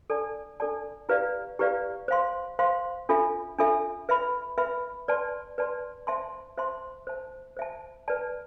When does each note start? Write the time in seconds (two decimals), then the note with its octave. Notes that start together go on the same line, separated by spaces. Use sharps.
0.10 D4 A4 D5 A5
0.60 D4 A4 D5 A5
1.09 E4 G4 B4 D5 F5
1.59 E4 G4 B4 D5 F5
2.08 C5 F5 C6
2.59 C5 F5 C6
3.09 D4 F4 A4 E5
3.58 D4 F4 A4 E5
4.09 B4 E5 B5
4.58 B4 E5 B5
5.08 B4 D5 A5 C6
5.58 B4 D5 A5 C6
6.07 C5 E5 A5 C6
6.58 C5 E5 A5 C6
7.07 C5 E5 A5
7.57 C5 E5 A5
8.08 B4 D5 A5